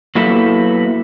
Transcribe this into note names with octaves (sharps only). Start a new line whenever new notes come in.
F#3 A#3 B3 E4 G4 A4